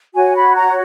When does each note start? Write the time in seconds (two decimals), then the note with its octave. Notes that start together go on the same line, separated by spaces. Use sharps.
0.14 F#4 C#5 G#5
0.35 B5
0.55 A#5